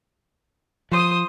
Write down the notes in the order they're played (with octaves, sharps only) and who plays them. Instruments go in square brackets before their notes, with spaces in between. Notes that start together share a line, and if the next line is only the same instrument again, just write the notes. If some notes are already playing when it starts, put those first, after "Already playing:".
[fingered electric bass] F3 [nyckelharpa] C5 D#6